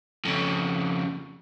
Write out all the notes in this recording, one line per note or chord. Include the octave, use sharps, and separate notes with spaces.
F2 C#3